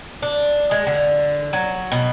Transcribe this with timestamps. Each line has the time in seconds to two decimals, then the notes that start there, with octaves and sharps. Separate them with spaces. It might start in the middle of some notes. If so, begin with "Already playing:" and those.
0.22 D4
0.71 G#3
0.87 D3
1.53 F#3
1.92 B2